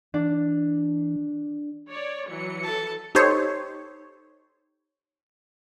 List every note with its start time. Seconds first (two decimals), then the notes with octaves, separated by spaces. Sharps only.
0.14 E3 D4
1.91 C#5 D5
2.29 E3 F#3 C#7
2.63 A4 A5
3.15 D#4 G4 A4 C5 C#5